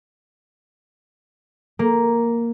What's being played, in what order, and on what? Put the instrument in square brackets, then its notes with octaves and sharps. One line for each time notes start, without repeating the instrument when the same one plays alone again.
[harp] A#3